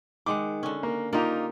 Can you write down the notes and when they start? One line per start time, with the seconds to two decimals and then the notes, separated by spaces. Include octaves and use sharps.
0.26 D#3 G#3 F#5 D6
0.63 D3 C#4
0.83 A#3
1.13 A#3 D#4 F4 G4